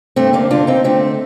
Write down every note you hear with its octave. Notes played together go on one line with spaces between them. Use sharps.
G2 A3 C4
D3 A#3 D4
D3 D4 F4
D3 C4 D#4
D3 A3 C4